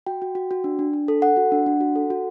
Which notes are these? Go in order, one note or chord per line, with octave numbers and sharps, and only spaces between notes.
F#4 G5
F#4
F#4
F#4
D4
D4
D4
A4
A4 F#5
F#4
D4
D4
F#4
A4
F#4